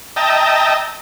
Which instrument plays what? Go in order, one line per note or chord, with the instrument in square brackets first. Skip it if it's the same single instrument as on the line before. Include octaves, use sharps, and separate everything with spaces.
[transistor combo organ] D#5 E5 G5 A5 A#5